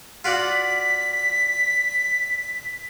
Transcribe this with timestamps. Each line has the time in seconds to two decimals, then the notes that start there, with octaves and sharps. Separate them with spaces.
0.24 F4 F#4 D5 B6